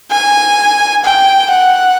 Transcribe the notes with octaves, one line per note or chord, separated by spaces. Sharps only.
G#5
G5
F#5